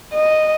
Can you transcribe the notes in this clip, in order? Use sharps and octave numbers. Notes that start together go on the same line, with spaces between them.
D#5